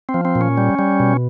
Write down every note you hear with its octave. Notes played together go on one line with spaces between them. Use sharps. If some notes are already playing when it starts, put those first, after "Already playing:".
C4
F3
C4
A#2
C#4
G3
G3
B2